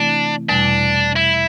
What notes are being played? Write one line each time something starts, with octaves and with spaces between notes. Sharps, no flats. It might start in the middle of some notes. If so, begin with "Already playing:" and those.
Already playing: C3 E3 A3 C4 D4 E4
E2 B2 G3 D4
E4